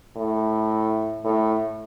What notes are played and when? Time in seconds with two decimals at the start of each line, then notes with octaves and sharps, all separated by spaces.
0.16 A2
1.25 A2